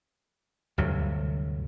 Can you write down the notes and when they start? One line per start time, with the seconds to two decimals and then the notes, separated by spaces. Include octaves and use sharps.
0.78 D2 G2 C3 F#3